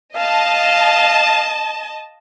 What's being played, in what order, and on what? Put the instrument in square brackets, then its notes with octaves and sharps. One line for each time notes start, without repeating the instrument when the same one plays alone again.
[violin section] D#5 A5 [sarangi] F5